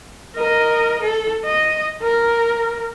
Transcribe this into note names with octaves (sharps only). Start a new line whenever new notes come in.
A#4 D#5
A4
D#5
A#4